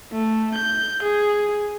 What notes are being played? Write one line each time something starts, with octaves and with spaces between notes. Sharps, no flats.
A3
G6
G#4